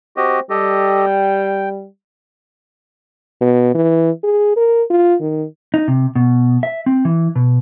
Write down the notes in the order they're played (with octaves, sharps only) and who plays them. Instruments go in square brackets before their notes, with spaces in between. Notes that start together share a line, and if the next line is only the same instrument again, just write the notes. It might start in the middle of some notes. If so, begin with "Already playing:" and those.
[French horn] C4 [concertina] F#4 G4 D#5
[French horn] G3 [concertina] G4 A4 D#5
[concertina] G5
[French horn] B2
E3
G#4
A#4
F4
D#3
[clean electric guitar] D#4
C3
B2
E5
C4
E3
B2